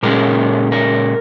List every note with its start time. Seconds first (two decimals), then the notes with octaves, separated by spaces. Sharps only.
0.03 A#2 G#3 C#4 A#4
0.72 A#4